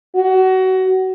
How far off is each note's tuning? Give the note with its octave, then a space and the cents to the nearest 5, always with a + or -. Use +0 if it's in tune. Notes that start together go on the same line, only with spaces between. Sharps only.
F#4 +25